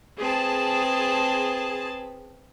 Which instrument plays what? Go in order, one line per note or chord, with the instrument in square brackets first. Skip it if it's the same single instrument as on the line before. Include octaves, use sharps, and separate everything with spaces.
[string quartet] C4 B4 [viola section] G#4 A5